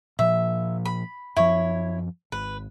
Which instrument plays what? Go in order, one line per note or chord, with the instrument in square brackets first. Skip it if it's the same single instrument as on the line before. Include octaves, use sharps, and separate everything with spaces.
[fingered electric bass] A#2 F3 [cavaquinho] E5
[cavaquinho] B5
[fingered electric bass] F#2 F3 [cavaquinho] E4 C#5
[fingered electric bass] G#1 [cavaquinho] B4